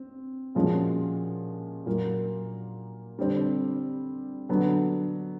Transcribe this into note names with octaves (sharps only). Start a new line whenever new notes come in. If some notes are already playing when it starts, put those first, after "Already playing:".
Already playing: C4
A#2 F3 G#3 C#4 F#4
A#2 F#3 A#3
D3 G3 C4
D3 F#3 B3